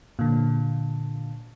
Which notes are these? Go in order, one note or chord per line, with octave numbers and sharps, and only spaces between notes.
A#2 D3